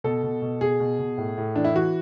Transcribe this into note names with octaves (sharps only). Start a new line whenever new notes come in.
B2 A4
B2
B2
B2 G#4
B2
B2
A2
A2
E3 D4
E4
E3 F#4